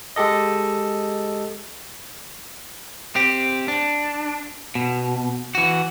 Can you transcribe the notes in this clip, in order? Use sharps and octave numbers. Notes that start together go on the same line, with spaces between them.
G#3 G4 A4 D#5
C4 G4
D4
B2
E3 F#4